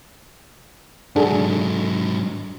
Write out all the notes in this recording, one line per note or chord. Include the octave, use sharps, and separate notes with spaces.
G#2 F#3 D4 G#4 A4